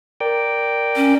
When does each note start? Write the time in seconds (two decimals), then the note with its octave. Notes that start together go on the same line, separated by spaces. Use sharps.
0.21 A#4 D5 G5
0.96 C#4